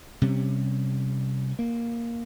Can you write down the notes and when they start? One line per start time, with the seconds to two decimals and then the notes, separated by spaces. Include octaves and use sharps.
0.22 C3 G3 C#4
1.59 A#3